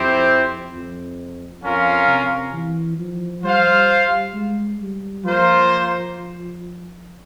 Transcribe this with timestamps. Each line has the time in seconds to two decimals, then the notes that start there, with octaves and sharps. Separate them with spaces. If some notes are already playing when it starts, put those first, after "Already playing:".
Already playing: F2 C4 E4 G4 C5
0.72 F2
1.62 F2 C#4 F4 A#4 F5
2.07 C3
2.53 E3
2.98 F3
3.43 G3 F4 C5 F5
4.34 G#3
4.80 G3
5.24 F3 A#3 F4 C5